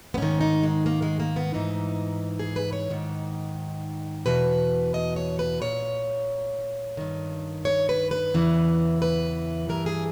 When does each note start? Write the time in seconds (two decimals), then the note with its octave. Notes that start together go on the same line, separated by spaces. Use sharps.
0.14 B3
0.18 G#2 D#3 C#4
0.41 D#4
0.63 G#3
0.86 A#3
1.02 G#3
1.20 A#3
1.36 B3
1.54 G#2 E3 D#4
2.39 G#4
2.56 B4
2.73 C#5
2.90 G#2 D#3
4.26 E2 B2 B4
4.94 D#5
5.16 C#5
5.39 B4
5.62 A#2 C#5
6.97 G2 D#3
7.65 C#5
7.89 B4
8.11 B4
8.34 E2 C#3 E3
9.02 B4
9.69 G2 E3 A#4
9.86 G#4